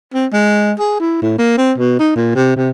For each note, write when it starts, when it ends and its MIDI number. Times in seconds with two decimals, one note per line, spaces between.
0.14 0.26 60
0.33 0.73 56
0.79 0.95 68
1.00 1.17 64
1.22 1.37 45
1.38 1.54 58
1.58 1.73 60
1.78 1.99 47
2.00 2.11 63
2.16 2.31 46
2.36 2.55 48
2.56 2.70 48